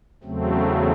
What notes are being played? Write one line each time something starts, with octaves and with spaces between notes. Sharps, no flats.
E2 C#3 F#3 A3 C4